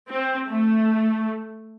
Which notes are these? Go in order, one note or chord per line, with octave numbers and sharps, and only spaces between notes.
C4
A3